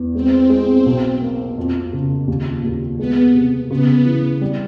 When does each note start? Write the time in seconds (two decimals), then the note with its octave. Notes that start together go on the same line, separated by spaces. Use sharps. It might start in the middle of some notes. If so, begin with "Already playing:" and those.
Already playing: E2
0.15 G#3 C4
0.50 G#3
0.86 B1
1.22 A#3
1.58 F2
1.93 C#3
2.28 D#2
2.64 D#2
2.99 G#3 B3
3.35 C3
3.70 C#3 B3
4.06 E3
4.41 G3